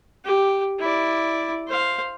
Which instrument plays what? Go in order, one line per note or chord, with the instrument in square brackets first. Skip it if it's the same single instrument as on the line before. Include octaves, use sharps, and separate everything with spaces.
[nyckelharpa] G4
E4 D5
C5 F5